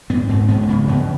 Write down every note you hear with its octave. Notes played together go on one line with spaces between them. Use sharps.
G#2 B3
G#2 C4
G#2 B3
C4
C#3 B3
E2 B3